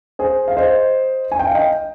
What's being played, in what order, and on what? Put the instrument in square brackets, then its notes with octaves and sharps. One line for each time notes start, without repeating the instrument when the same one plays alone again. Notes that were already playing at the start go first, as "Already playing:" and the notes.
[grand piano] G#4 C5
F5
C5 D#5
G#5
G5
F5
D#5 G5